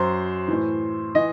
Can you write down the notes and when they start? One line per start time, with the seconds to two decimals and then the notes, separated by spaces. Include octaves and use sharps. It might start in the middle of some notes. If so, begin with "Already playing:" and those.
Already playing: F#2 F#3 C5
0.48 A2 E3
1.15 E3 D#5